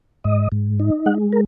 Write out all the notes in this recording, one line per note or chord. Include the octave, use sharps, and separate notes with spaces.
G#2 D#5
G#2
D#4
G#3 F#5
A#4